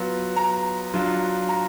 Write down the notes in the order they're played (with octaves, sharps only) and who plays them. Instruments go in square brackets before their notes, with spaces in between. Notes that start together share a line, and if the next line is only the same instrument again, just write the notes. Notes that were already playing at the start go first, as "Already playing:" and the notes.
Already playing: [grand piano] F#3 B3 F4
A#5
F#3 D4 F4
A#5